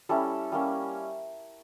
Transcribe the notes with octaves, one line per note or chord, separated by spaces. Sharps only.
G3 C#4 E4 A4
G3 A#3 C#4